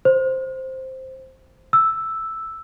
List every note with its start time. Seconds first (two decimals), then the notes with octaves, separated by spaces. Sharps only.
0.05 C5
1.73 E6